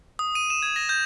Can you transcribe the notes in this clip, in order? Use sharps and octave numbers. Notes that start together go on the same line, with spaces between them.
D#6
D#7
E7
G#6
A#6
G6